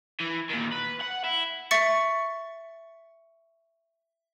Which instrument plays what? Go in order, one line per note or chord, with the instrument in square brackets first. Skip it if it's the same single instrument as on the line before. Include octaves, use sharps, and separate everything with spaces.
[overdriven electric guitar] E3
A#2 D#3
B4
F#5
E4
[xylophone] E5 C#6 A6 C#7